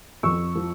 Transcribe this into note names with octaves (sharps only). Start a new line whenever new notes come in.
F2 C#6 E6
F3